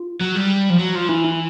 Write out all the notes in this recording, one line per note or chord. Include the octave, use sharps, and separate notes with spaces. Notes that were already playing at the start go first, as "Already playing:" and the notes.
Already playing: F4
F#3
G3
F3
F#3
F3
E3 E4
E4